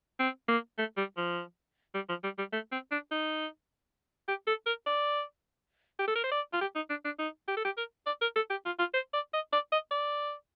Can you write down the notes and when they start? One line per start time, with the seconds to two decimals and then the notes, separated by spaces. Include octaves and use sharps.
0.20 C4
0.48 A#3
0.78 A3
0.97 G3
1.17 F3
1.95 G3
2.09 F3
2.24 G3
2.38 G3
2.53 A3
2.72 C4
2.91 D4
3.11 D#4
4.28 G4
4.47 A4
4.66 A#4
4.86 D5
5.99 G4
6.08 A4
6.16 A#4
6.24 C5
6.32 D5
6.53 F4
6.61 G4
6.75 D#4
6.90 D4
7.05 D4
7.19 D#4
7.48 G4
7.57 A4
7.65 G4
7.78 A#4
8.07 D5
8.21 A#4
8.36 A4
8.50 G4
8.66 F4
8.79 F4
8.94 C5
9.13 D5
9.34 D#5
9.53 D5
9.72 D#5
9.91 D5